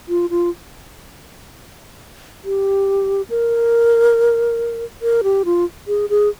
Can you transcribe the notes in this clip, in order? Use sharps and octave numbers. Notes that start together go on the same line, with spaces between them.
F4
F4
G4
A#4
A#4
G4
F4
G#4
G#4